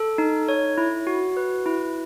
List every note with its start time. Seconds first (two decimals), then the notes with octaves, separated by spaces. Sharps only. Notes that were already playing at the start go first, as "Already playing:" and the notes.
Already playing: A4
0.18 D#4
0.49 C#5
0.78 E4
1.07 F#4
1.37 B4
1.66 E4